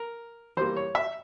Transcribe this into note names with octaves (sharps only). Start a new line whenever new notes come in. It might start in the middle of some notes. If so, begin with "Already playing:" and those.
Already playing: A#4
E3 G3 A#3 C5
C#5
E5